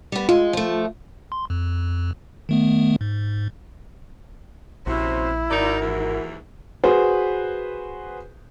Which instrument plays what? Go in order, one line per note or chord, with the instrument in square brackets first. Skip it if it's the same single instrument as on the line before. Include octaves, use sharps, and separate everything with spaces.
[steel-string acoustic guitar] G3 B3
[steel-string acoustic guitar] G#3 [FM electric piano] F4
[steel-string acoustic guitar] F3 A3
[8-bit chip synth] C6
F2
D#3 A3 B3
G#2
[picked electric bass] A#1 [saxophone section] C3 F#4 [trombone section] C4 C#4 C5 [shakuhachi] E4
[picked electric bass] G#1 [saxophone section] D#4 D5 [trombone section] F#4 A#4
[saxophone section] D#2 G#2 E3
[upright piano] F#4 G#4 B4 C5